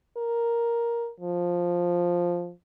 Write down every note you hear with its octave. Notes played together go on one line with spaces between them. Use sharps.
A#4
F3